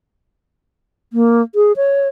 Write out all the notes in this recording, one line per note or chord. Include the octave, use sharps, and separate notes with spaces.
A#3
G#4
C#5